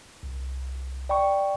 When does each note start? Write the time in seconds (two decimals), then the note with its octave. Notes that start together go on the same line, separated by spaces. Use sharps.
0.23 C2
1.09 D5 G5 B5 C#6